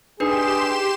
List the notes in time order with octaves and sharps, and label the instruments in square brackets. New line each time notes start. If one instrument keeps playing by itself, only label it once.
[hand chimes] D4 D#4 B4 [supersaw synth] G4 C6 E7 [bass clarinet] G#4